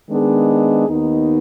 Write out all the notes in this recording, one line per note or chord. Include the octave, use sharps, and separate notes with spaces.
D#3 G#3 B3 D4 G#4
D#2 D#3 B3 D#4